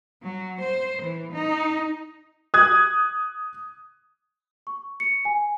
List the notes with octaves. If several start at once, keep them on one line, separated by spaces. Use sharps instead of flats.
F#3
C5
E3
D#4
D#6 F#6 G#6
C#6
C#7
G#5